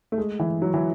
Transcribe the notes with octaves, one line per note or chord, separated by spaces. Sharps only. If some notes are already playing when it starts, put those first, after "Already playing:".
A3
G#3
E3
F#3
E3